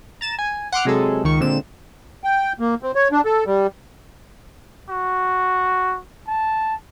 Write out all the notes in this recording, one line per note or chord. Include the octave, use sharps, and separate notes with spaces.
A#5 A6 E7
G#5
F#5 C6 D6 F6
C3 F#3 G#3 G#4 A4
C#2 D#3 C#6
A#2 D3 G#3 C4 E7
G5
A#3
C4
C#5
D4
A4
G3
F#4
A5